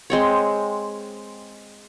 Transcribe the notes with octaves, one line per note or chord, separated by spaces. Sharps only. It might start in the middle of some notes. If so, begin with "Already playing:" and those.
G#3 C4 C#5